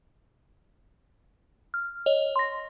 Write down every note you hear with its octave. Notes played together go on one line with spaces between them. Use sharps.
F6
C#5 D#5
C6 A#6